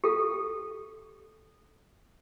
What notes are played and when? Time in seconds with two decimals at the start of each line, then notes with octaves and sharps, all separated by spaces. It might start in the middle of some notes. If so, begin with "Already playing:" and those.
0.04 G4 A4